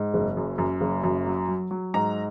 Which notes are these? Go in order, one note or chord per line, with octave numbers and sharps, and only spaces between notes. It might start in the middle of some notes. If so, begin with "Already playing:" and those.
Already playing: G#2
F#1
F#2
F#2
F#1
F#2
F#3
F#3
F#3
G#2 A#5